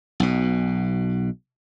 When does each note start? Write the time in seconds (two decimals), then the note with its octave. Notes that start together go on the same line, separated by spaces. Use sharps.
0.20 B1 B2